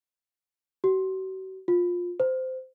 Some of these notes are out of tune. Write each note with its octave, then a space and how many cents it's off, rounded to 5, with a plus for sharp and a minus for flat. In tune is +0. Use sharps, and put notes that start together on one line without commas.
F#4 +40
F4 +20
C5 -15